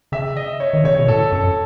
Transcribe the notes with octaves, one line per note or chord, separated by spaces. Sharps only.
C#3 E5
D#5
C#5
D#3
C#3 C#5
B2
A2 A4
F#2 A4